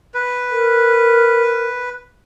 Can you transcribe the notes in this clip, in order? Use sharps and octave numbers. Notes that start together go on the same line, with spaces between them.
B4
A#4